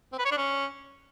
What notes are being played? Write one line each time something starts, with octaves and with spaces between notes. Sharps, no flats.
C4
B4
C#5
D4
C#4